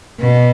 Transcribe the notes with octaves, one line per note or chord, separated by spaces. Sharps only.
B2